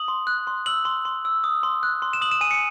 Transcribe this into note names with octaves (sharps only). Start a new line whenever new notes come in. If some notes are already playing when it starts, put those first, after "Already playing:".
Already playing: D#6 F#7
C6
F#6
C6
E6 F#7
C6
C6
E6
D#6
C6
F#6
C6
E7
D#6 F#7
E7
G#5 D#7
C#7